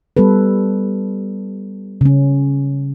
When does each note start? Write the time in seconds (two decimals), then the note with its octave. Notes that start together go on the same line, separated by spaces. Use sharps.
0.17 G3 B3 A4 B4
2.01 C#3 C#4